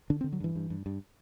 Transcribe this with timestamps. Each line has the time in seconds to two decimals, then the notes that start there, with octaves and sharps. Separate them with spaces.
0.10 D3 D4
0.21 C4
0.24 D3
0.33 F#3
0.40 G2 E3
0.55 G2
0.70 G2
0.86 G2